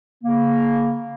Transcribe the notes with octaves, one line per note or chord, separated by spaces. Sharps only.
C#3 A#3